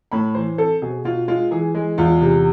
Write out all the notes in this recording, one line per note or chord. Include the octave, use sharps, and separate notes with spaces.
A2 B5
E3 C5
C4 A4
B2 G#4
B2 F4
G#3 F4
E3 G#4
G#3
E2 F4
C3